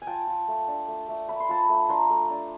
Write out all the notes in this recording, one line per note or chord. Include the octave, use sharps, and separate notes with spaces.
G#5
F4 G5 A5
F4
A3
D4
A3
A3
A3 B5
C6
F4 A5 B5
A3
D4 A#5 C6
A3
D4